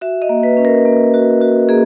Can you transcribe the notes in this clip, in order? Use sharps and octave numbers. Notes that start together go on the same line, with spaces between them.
F#4 E5
D#5
A#3
B4
C#4
A#4
A#3
F#4
F#4
A#3 G#4